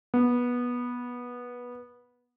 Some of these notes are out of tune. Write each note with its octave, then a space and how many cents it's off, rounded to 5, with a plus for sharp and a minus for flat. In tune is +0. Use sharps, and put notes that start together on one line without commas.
B3 -15